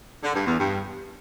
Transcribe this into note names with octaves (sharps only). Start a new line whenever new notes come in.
D3
G2
E2
G2